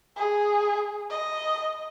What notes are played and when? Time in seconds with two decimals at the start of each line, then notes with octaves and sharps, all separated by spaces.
0.17 G#4
1.10 D#5